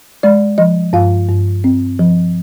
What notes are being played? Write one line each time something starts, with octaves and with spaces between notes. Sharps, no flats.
G#3 D5
F3 D#5
G2 F5
G2
C4
F3